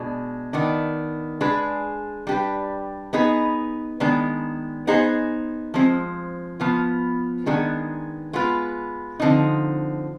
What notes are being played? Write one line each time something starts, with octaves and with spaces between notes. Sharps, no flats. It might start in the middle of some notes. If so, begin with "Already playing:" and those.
Already playing: B2 G#3 D4
D#3 B3 D4
G#3 D4 G#4 B4
G3 D4 G4 B4
B3 D#4 G#4 B4
D#3 G#3 B3 D4
B3 D#4 G#4 C5
F3 G#3 C4
F3 B3 F4
D#3 G#3 B3 D4 G#4
G#3 B3 F4 B4
D3 F3 C4 D#4